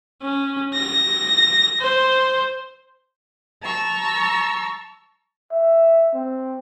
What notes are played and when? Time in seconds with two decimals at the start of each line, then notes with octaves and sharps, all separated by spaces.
0.23 C#4
0.74 A#6
1.80 C5
3.62 A5 A#5 C#6 E6
5.51 E5
6.14 C4